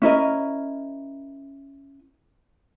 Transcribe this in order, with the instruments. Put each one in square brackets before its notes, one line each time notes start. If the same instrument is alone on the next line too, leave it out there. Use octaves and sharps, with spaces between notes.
[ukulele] C#4 E4 A#4 D#5